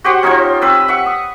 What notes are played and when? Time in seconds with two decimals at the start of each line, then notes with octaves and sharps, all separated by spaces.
0.04 F#4 G4 C5 F#5
0.23 C#4 D#4 F4 C5
0.62 C4 B4 E6
0.88 E5 F#5 C#6
1.06 D#6